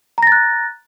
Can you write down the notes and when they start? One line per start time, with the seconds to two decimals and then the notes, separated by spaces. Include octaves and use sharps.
0.18 A#5
0.23 A#6
0.27 A6
0.32 F#6